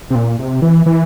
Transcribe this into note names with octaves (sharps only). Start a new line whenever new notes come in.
C3
A#2
C3
E3
E3